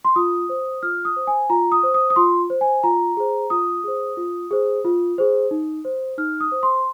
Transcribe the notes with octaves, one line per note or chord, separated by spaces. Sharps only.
C6
F4 D#6
C5
F4 F6
D#6
C5
G#5
F4 A#5
D#6
C5
D#6
D#6
F4 C6
C5
G#5
F4 A#5
G#4 C5
F4 D#6
G#4 C5
F4
G#4 C5
F4
G#4 C5
D#4
C5
D#4 F6
D#6
C5
C6